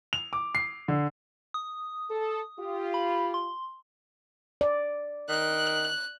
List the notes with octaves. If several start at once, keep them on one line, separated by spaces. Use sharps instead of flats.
F7
D6
C7
D3
D#6
A4
F4 G4
B5
C6
D5
D#3 F#6